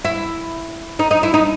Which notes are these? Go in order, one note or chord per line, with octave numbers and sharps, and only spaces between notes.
E4
D#4
D#4
E4
D#4